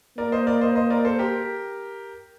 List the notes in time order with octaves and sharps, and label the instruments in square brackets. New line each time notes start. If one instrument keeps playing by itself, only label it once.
[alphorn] A#3 [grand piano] A#4 D5
[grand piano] C5 D#5
A#4 D5
C5 D#5
C5 D#5
A#4 D5
A4 C5
G4 A#4